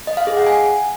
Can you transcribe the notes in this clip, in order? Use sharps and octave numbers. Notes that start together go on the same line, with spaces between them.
D#5
F5
G#4
F#5
G#5